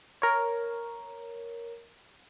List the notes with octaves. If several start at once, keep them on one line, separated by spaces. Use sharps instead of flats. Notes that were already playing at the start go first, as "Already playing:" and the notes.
A#4 C#5